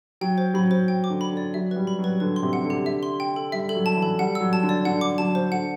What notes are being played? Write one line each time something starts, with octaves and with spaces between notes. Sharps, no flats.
F#3 G5
C5
F#3 B5
C5
G5
D6
D3
B5
D3 D5
F#3 E5
B4
G3
B5
F#3
B4
D3 B4
C6
C3
F#5
D3
G4
E5
C6
G5
A4
G3 E5
A4
F#3
A5
E3
A4
G3 F#5
E6
F#3
A5
D3
D5
D3 F#5
D6
F#3 A5
C5
D3 F#5